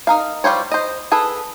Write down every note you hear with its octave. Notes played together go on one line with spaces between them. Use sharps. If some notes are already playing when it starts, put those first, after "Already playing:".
D#4 A#4 F5
G3 F4 C5 C#5
C5 D#5
G#4 A4 B4